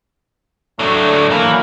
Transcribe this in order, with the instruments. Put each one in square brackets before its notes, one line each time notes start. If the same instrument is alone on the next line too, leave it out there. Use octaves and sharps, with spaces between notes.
[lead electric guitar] A2 D4 [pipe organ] F#3 F#4 C#6 [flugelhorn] A3
[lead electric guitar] E3 [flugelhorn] A#3